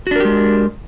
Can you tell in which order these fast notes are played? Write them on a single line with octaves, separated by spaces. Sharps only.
F#4 D4 A#4 G4 G#3